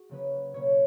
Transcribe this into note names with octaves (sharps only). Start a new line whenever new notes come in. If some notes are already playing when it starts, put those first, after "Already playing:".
Already playing: F#4 G#4
C#3 F#3 A#3 C#4 B4
B2 A#3 C#4 C#5